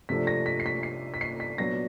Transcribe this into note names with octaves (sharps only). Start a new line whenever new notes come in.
C3 F3 A3 D4 B6
A#6
B6
C7
B6
C7
B6
C7
B6
A#2 F#3 B3 D4 A#6